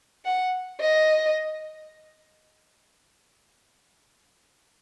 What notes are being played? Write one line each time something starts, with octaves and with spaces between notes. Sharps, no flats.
F#5
D#5